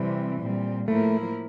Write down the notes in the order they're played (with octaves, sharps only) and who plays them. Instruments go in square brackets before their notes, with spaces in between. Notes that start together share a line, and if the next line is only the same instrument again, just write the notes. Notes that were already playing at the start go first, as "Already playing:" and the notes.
Already playing: [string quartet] C3 E3 G3 C4
A#2 G3 C4
[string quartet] A2 F3 A#3 E4 A#4 [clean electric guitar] A3